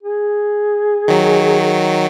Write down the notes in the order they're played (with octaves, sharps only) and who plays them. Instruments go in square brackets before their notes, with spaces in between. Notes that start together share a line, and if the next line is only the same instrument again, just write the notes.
[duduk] G#4
[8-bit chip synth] D#3 F#3